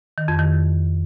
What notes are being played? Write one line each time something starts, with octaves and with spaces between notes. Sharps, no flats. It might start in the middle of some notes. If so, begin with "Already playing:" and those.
D#3
F2
D#3